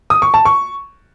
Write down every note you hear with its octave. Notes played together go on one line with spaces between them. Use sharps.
D#6
C#6
A5
C#6